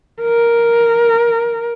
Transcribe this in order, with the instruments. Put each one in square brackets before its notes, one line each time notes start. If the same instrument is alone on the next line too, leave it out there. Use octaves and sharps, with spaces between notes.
[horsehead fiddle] A#4